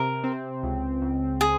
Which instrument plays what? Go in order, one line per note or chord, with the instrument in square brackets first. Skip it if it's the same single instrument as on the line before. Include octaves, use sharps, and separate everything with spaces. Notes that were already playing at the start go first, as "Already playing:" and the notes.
Already playing: [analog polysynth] C3 [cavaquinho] A#4
[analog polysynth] C4
C#2
C#2
[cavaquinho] G#4